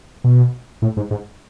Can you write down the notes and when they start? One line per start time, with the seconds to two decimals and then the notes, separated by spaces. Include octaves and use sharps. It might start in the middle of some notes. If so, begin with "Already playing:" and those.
0.24 B2
0.82 A2
0.97 G#2
1.11 G#2